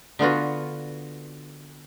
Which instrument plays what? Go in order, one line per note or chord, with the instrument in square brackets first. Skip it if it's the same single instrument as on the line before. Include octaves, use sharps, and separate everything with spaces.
[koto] D3 B3 F4 F#4